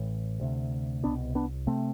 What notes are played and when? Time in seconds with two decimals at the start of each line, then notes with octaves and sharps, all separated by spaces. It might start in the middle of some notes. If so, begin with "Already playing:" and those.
Already playing: A1 A2
0.41 D2 C3
1.04 C2 B2 B3 D4
1.35 B3 D4
1.67 C3 A3 C4